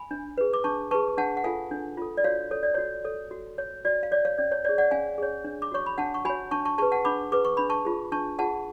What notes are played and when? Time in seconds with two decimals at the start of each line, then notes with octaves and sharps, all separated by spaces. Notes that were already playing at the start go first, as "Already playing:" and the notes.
Already playing: G#5 B5
0.11 D4
0.38 G#4 B4
0.53 D6
0.64 D4 A5 C#6
0.91 G#4 B4 A5 C#6
1.18 D4 F#5 A5
1.37 F#5
1.44 F4 A4 F5 G#5
1.71 D4
1.97 F4 A4
2.17 D5
2.24 F#4 C#5 F5
2.51 A4 C#5
2.63 D5
2.74 F#4 C#5
3.05 A4 C#5
3.31 F#4
3.58 C#5
3.85 F#4 D5
4.03 F5
4.12 C#5 D5
4.25 C#5 F5
4.38 C#4 D5
4.51 C#5
4.64 G#4 C#5 D5
4.78 D5 F#5
4.91 C#4 F5 G#5
5.18 G#4 C#5
5.44 D4
5.62 D6
5.72 F#4 C#5 C#6
5.86 B5
5.98 D4 F#5 A5
6.14 C#6
6.25 F#4 C#5 G#5 B5
6.51 D4 A5 C#6
6.65 A5 C#6
6.78 G#4 B4 A5 C#6
6.92 F#5 A5
7.05 D4 B5 D6
7.32 G#4 B4 D6
7.45 C#6
7.57 D4 B5
7.70 A5 C#6
7.85 F4 G#4
8.12 D4 A5 C#6
8.39 F4 G#4 F#5 A5